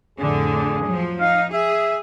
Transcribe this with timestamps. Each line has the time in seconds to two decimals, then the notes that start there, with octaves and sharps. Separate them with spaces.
0.19 F2 A2 D3 G#4
0.85 F3 F#3
1.20 D#4 F5
1.54 G#4 E5